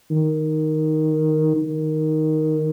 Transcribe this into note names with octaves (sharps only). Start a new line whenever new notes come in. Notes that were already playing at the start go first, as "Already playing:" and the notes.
D#3
D#3